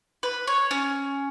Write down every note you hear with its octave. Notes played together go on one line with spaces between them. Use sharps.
B4
C#5
C#4